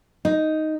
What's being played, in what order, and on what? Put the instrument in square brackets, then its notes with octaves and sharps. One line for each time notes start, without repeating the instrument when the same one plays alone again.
[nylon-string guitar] D#4